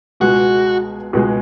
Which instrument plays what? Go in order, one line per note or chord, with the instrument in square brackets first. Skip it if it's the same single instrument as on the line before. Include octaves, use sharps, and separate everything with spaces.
[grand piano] C#2 B2 G#3 [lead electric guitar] F#4
[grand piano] C#2 B2 G#3